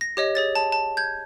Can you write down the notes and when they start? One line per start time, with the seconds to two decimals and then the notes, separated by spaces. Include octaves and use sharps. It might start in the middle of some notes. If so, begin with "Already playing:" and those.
0.01 A#6
0.17 G4 C#5 D#5
0.35 G#4 C#5 A6
0.55 A5
0.72 A5
0.97 G6 G#6